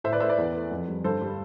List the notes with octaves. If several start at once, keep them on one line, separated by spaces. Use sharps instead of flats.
A2 C5 E5
B4 D5
A3 C5 E5
B4 D5
E2
A3
F2
G3
G2 A4 C5
G3